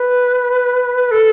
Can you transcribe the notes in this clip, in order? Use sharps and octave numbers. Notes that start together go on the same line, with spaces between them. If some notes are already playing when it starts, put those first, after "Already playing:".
Already playing: B4
A4